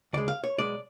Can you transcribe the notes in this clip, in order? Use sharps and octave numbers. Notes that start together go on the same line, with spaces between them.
D2 C#3 G#3 D5
F5
C#5
B1 B2 G#3 D5